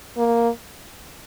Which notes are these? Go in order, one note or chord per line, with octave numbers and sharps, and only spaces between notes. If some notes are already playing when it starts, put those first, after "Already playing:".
A#3